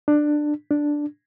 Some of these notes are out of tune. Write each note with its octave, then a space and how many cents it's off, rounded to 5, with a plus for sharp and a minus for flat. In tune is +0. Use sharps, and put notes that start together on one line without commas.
D4 +15
D4 +0